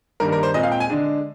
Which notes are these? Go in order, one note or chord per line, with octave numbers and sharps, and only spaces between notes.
G2 D#3 A#3 D4 A#4
A#4
C5
A#2 G#3 C4 D#5
F5
G5
G#5
D3 G#3 D4